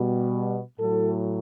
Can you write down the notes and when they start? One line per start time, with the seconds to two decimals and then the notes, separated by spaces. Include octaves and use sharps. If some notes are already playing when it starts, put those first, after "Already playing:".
Already playing: B2 G3
0.80 A2 F#3 A4